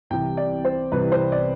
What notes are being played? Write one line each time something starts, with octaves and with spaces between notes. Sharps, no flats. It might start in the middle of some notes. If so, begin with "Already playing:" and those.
C2 C3 E3 G5
D5
C5
C2 C3 E3 B4
C5
D5